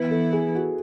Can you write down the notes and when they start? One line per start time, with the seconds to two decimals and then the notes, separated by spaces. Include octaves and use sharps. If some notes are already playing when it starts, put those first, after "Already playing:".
Already playing: E3 B3 E4 B4
0.11 A4
0.33 G#4
0.55 F#4